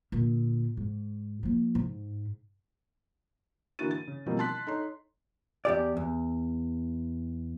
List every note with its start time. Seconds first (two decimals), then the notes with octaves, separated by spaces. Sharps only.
0.12 A#2 D3
0.77 G#2
1.43 F3 A#3
1.75 G#2
3.79 D3 E3 A#3 F#4 A6 D#7
3.91 A6
4.07 C#3
4.26 B2 F3 G3 A#3 C4
4.39 A5 C6 F#6 B6
4.67 D#4 A4 C#5 C6
5.65 E2 G4 D5
5.97 E2